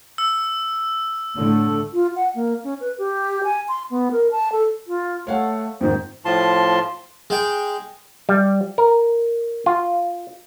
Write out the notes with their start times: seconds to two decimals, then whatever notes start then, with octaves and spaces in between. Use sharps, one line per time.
0.18 E6
1.37 A2 D3 A3
1.92 F4
2.16 F#5
2.35 A#3
2.64 C#4
2.81 B4
2.98 G4
3.44 G#5
3.68 C6
3.90 B3
4.11 A#4
4.32 A5
4.52 A4
4.87 F4
5.27 A3 C#5 F5 F#5
5.81 F2 G#2 D#3 C5
6.25 A2 F3 F4 A5 C6
7.30 G#3 G5
8.29 G3
8.78 A#4
9.66 F4